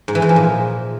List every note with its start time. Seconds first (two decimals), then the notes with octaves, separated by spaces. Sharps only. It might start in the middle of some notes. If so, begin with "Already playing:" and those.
0.08 G#2
0.15 E3
0.22 G#2
0.29 F3
0.36 A#2